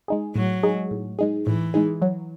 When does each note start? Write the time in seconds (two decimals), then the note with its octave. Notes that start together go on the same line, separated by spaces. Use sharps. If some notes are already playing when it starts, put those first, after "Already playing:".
0.08 G#3 D#4 G#4
0.35 A2 F#3
0.63 G#3 D#4 G#4
0.91 A2
1.19 G#3 D#4 G#4
1.46 A2 E3
1.74 G#3 D#4 G#4
2.02 F#3